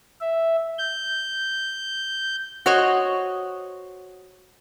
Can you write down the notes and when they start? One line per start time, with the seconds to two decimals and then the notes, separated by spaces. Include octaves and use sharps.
0.21 E5
0.78 G6
2.66 F#4 C5 C#5 D#5